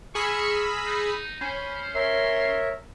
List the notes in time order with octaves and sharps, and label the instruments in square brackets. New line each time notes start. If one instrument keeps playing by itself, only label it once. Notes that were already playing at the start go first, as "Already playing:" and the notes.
[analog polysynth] G#4 B5 E6 [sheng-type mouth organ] A#5 F6 [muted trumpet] C#6
[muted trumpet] D#4
[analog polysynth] C#4 [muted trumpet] C5 [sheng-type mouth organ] B5
[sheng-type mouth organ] A#4 C#5 E5 [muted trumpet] C6